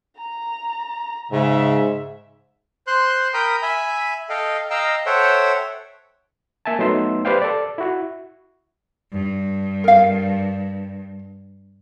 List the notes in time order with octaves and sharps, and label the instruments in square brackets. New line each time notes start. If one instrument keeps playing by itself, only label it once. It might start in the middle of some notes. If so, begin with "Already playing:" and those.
[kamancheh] A#5
[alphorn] G#2 [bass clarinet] C#3 [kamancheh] E5
[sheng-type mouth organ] C5 C6 F#6
A#4 G5 A#5 B5 D#6 G6
E5 G#5 B5
A4 D#5 F5 G5
D#5 F5 G5 A#5 E6
A4 C5 C#5 E5 F#5 G5
[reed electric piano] A#3 E5 G#5 A5
F#3 A3 B3 D#4 C6 E6
G4 B4 C5 D5 F5 G5
A4 D5
E4 F#4
[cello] G2
[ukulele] A#4 F5